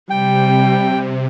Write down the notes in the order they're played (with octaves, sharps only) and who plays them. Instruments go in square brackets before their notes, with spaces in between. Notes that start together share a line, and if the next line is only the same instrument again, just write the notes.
[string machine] C3 [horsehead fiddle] G3 [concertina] G5